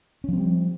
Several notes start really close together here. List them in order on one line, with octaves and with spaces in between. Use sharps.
C#4 F3 C4 G3